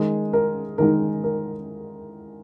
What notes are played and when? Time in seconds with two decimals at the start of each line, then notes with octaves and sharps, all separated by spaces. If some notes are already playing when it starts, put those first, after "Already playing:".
Already playing: D#3 G#3 D#4 G#4
0.33 A#4
0.78 D#3 G#3 D#4 A#4
1.24 A#4